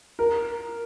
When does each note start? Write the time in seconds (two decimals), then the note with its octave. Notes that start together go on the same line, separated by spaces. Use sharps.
0.19 A#4